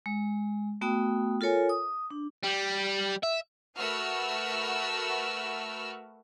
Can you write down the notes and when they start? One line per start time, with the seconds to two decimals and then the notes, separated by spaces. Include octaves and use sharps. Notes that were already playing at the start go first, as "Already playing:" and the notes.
0.06 G#3
0.81 A3 B3 F#4 G5 D#6
1.41 F4 A4 A#4 C#5 G#5
1.69 D#6
2.11 D4
2.43 G3
3.23 E5
3.77 A3 F#4 A#4 B4 E6 F6